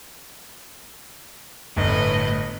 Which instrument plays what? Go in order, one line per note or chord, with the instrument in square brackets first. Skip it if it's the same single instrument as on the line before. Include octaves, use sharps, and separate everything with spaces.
[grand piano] G1 [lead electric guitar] A2 [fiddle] B4 D#5